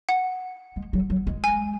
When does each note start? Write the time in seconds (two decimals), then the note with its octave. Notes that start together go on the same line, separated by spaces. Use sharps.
0.09 F#5
0.76 G#3
0.93 F#3
1.10 F#3
1.27 G#3
1.44 G#5